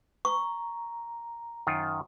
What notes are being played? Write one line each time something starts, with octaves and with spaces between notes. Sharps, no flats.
A#5 C#6
F#2 D#3 F4